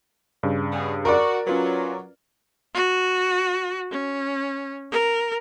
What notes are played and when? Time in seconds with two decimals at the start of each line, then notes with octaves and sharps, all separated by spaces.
0.43 G2 C#3
0.72 G3 B3 G#4
1.05 F#4 A#4 D5
1.47 F#3 C#4 F4 B4
2.74 F#4
3.92 C#4
4.92 A#4